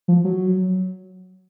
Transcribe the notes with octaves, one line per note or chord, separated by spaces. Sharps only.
F3
F#3